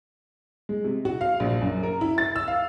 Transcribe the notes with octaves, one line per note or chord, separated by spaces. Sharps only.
G#3
C3
F#4
F5
A#1
F#2
A#4
E4
A6
E6
F5